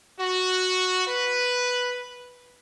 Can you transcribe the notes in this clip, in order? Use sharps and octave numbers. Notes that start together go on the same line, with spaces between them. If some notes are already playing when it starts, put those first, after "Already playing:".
F#4
B4